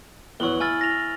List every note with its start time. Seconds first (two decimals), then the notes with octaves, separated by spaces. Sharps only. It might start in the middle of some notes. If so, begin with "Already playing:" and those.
0.40 E2 F#3 C#6 F#7 G7
0.60 E4 G#5 F6 A6
0.81 A#6 F7